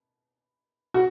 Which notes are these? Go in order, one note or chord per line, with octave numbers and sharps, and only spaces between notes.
F#4